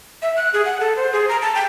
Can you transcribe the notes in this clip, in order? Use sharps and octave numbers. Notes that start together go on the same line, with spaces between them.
E5
F#6
G#4
F#5
A4
C5
G#4
A#5
A5
G5